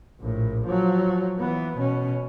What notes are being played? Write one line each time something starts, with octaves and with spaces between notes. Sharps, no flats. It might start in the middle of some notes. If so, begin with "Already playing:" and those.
A#1 A2
F3 F#3
E3 B3
B2 C#4